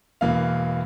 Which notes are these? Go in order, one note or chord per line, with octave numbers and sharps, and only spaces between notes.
E1 E3 A#3 F5